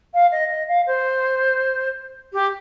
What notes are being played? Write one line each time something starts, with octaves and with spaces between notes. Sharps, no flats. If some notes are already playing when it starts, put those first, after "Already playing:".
F5
D#5
D#5
F5
C5
G4